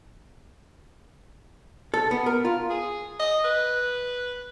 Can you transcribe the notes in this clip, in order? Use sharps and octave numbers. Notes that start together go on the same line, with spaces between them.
A4
B3
A#4
F4
G#4
D#5
B4